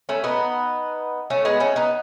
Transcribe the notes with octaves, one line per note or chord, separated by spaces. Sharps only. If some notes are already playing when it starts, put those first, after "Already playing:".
A3 C#4
B3 D#4
A3 C#4
G#3 B3
A3 C#4
B3 D#4